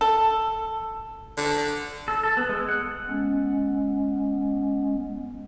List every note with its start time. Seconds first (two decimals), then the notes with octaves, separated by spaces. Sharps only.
0.01 A4
1.37 D3
2.08 A4
2.23 A4
2.37 B3
2.49 G#3
2.69 F#5
3.08 G#3 B3 C#4